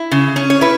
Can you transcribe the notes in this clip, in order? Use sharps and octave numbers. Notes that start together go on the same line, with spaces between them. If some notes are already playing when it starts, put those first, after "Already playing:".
Already playing: E4
C#3
C#4
C#5
E4 B4